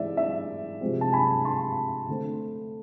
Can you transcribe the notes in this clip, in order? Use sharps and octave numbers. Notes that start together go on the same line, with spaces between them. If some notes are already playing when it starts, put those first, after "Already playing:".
Already playing: E3 G#3 C4 D5 E5
E5
C3 F3 G#3 C4
A5
G#5 B5
A5 C6
D3 A3 C4